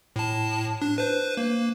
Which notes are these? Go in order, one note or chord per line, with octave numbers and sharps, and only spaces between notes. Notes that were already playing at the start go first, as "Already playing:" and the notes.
A2 A5
D4
B4 C5
A#3